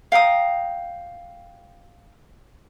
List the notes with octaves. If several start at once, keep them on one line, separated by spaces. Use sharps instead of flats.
F5 G5 A#5 D#6